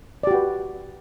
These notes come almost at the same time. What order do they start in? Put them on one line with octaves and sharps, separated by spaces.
D5 G4 F#4 B4